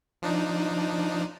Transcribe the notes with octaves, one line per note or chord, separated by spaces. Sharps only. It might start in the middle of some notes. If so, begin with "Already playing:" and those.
F3 D4 D#4